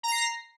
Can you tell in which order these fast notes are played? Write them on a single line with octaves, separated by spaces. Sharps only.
A#5 A#6 C7